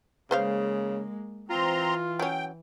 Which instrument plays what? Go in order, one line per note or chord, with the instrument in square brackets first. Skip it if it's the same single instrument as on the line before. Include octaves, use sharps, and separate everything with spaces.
[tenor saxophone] C#3 [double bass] G#3 A#3 [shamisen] B4 C5 F5
[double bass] E3 [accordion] C4 A#5 C6 [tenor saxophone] F4
[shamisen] F#3 C#4 [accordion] G5